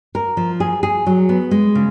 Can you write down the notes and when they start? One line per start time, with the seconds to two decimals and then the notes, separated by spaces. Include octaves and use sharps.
0.15 A#4
0.37 F3
0.60 G#4
0.83 G#4
1.06 F#3
1.29 B3
1.51 G#3
1.75 C#3